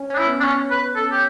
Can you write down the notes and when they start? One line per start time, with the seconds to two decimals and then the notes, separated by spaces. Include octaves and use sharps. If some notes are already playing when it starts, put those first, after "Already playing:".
Already playing: C#4
0.10 C#4 D4
0.18 E4
0.27 B3
0.40 D4
0.44 C#4
0.71 B4
0.96 A4
1.12 G4